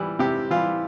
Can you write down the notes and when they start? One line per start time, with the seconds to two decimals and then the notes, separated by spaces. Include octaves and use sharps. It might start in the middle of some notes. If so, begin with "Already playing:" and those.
Already playing: E3 G3
0.19 C3 G4
0.51 E3 G3 F4